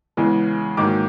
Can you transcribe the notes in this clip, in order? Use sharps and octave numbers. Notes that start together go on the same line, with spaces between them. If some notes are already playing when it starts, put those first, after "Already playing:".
E2 C#3 E3 G#3
G#2 D#3 F#3 A#3 D6